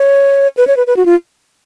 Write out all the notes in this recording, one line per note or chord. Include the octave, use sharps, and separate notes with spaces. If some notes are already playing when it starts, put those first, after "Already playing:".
Already playing: C#5
B4
C#5
B4
B4
F#4
F4